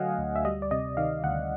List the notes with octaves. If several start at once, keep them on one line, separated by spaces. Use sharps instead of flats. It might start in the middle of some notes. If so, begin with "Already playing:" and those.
Already playing: D3 F#3 A3 D#5 F5 F#5 G#5
D2
E5
G3 D#5
D5
C3 D#5
D#3 F5
D2 F#5